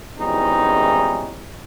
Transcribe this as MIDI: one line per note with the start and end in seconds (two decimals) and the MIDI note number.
0.19 1.44 32
0.19 1.44 40
0.19 1.44 52
0.19 1.44 55
0.19 1.44 61
0.19 1.44 63